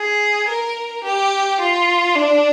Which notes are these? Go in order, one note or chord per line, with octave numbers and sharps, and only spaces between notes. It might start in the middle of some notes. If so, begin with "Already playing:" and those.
Already playing: G#4
A#4
G4
F4
D4